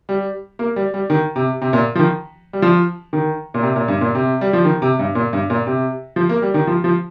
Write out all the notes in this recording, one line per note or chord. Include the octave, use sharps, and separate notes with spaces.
G3
A#3
G3
G3
D#3
C3
C3
A#2
F3
D#3
G3
F3
D#3
A#2
C3
A#2
G2
A#2
C3
G3
F3
D#3
C3
G2
A#2
G2
A#2
C3
F3
A#3
G3
D#3
F3
F3